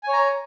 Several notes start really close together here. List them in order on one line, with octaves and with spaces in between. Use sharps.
G#5 C#5 A#5